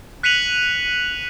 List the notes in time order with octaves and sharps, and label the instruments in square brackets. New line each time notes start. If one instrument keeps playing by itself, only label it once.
[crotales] F#6 B6 C#7 D#7 F7 F#7